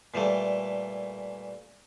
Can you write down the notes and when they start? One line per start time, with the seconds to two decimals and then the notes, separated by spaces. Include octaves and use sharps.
0.14 A#2 E3 G3 A3